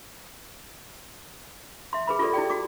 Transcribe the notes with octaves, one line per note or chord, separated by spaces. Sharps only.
E5 C6
G#4 B4 B5
F4 G4 A4 D5
E4 G4 D5 G5
F#4 D5 D6